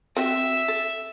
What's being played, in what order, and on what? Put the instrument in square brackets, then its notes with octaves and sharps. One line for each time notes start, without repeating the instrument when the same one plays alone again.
[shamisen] C4 F#4 G5 [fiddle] E5
[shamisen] A4